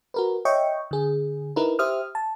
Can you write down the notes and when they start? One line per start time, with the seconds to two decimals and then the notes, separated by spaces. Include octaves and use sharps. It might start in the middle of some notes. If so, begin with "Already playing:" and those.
0.14 F#4 A#4 B4
0.45 C#5 D#5 E5 G5 C#6
0.91 D3 G#4
1.56 D#4 E4 A#4 B4
1.79 G4 C5 E5 D#6 F6
2.15 A5